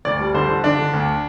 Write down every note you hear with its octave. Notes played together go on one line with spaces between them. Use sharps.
D2 D5
G3
D3 C5
D3
D3 D4
D3
D2